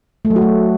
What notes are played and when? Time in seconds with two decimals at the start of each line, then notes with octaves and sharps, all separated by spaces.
0.25 A3
0.30 F#3
0.36 F#4
0.42 A3